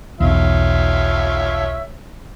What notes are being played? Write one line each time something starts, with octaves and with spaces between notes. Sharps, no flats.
B1 E2 F4 C#5 E5